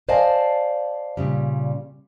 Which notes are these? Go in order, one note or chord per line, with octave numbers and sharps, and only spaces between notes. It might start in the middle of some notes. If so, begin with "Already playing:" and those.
C5 D5 D#5 F5 G#5 A5
A#2 C#3 G3